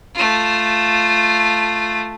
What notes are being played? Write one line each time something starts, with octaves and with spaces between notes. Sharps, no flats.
A3 F4